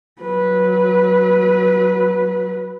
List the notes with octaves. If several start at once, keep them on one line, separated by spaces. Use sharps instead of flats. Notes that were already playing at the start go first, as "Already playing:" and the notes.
F#3 B4